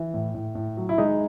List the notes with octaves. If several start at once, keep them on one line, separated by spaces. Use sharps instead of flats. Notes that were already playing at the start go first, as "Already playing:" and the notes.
Already playing: E3
A2
A2
A2
F#3
E4
G#3 D#4